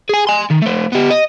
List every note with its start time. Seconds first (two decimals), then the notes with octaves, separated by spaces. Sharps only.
0.09 G#4 G#5
0.27 G#5 C6
0.51 D#3
0.62 A3 C4
0.92 B3 G4
1.10 D#5